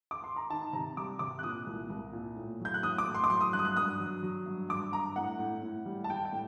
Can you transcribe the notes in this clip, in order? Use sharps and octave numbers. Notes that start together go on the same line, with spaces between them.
D6
C6
A#5
D#3 A5
C3 A#5
G3 D6
C3 D6
F#6
A#2 D#6
C2
C2
A#2
A2
F#3 G6
F#6
A2 D#6
D6
A2
C6
D6
F#3 C6
D#6
G2 F#6
D#6
F#6
G2 D#6
F#3
F#3
G2
G2 D6
G2 A#5
A2 F#5
A2
A2
G3
A5
G3 G5
G5
A2